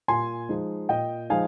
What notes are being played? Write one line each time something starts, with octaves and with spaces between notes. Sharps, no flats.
A#2 G#5 C6
F3 G#3 D#4
A#2 D#5 G5
F3 G#3 D#4 F5 G#5